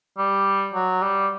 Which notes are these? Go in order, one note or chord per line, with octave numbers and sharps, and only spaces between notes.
G3
F#3
G3